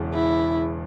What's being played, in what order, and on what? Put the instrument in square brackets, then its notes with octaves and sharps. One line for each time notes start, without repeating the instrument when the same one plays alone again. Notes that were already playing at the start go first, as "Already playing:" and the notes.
Already playing: [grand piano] E1 E2 C#3 E3
[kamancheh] E4